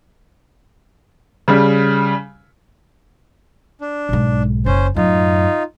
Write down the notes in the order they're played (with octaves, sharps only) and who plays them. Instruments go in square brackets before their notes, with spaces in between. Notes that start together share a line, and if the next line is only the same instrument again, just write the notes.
[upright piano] C#3 G3
[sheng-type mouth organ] D4
[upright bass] B1 G#2
[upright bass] F#1 [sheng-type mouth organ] C#4 C5
[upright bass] F#2 A2 [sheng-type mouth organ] D#4 F4